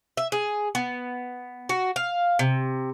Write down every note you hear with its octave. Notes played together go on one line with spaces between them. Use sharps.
E5
G#4
B3
F#4
F5
C3